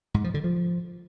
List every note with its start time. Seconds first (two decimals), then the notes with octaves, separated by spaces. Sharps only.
0.14 G#2
0.24 F3
0.34 D3
0.44 F3